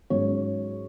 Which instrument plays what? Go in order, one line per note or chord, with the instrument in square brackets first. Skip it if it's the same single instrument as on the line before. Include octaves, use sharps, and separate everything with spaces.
[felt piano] G#2 F#3 C#4 C#5